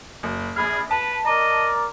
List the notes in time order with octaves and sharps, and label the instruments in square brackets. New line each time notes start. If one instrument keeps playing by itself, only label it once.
[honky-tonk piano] F#1
[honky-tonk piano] A#1 B5 F6 [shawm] G#4
[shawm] B4 [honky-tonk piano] A5
[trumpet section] A#4 D5 A#5 [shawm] D#5